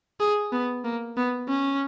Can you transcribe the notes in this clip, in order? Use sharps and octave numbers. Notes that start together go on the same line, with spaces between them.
G#4
B3
A#3
B3
C#4